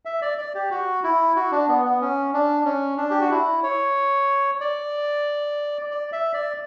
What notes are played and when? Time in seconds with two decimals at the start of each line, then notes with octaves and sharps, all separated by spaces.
0.05 E5
0.22 D5
0.38 D5
0.55 G4
0.71 F#4
1.04 E4
1.36 F#4
1.52 D4
1.68 B3
1.85 B3
2.01 C#4
2.33 D4
2.65 C#4
2.98 D4
3.11 G4
3.21 F#4
3.31 E4
3.63 C#5
4.61 D5
5.91 D5
6.12 E5
6.34 D5